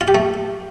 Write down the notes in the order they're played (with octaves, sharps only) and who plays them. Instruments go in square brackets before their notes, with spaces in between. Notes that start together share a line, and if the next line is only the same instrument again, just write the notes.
[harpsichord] F4
G4
A3